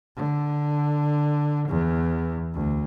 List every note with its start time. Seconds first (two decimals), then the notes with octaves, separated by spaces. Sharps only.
0.16 D3
1.68 E2
2.54 D2